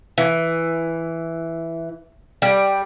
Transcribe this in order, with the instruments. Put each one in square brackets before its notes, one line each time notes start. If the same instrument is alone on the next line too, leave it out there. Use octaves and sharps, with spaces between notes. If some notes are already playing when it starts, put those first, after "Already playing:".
[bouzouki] E3
G3